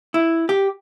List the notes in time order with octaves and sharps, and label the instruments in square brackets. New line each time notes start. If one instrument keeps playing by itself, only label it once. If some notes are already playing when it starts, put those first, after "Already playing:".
[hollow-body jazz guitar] E4
G4